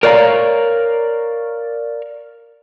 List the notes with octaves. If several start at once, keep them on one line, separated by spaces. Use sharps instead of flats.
A#4 C#5 D5 F5 A#5